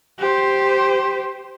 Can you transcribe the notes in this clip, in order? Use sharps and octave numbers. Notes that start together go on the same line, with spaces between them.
G4 C5